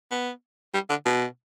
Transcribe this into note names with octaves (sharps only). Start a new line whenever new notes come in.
B3
G3
D3
B2